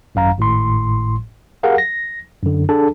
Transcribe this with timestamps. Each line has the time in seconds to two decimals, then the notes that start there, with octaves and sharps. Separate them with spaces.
0.15 G#1 F#2 F5 A#5
0.37 G#1 A2 C6
1.63 G4 G#4 A#4 F5 F#5
1.78 A#6
2.43 F#2 D3
2.69 D4 G#4 A4 A5